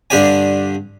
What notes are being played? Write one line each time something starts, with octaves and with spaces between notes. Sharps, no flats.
G2 D3 D4 G4 D5 G#5